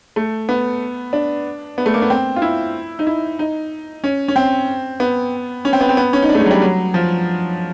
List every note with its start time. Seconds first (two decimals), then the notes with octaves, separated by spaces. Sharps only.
0.16 A3
0.49 B3
1.13 D4
1.78 B3
1.86 A3
1.94 A#3
2.02 B3
2.10 C4
2.36 F4
2.42 E4
2.99 D#4
3.07 E4
3.39 D#4
4.04 C#4
4.28 C#4
4.36 C4
5.00 B3
5.65 C#4
5.73 C4
5.81 B3
5.89 C4
5.97 B3
6.13 C#4
6.22 D#4
6.29 D4
6.35 A3
6.40 G#3
6.45 F#3
6.51 G3
6.62 F#3
6.94 F3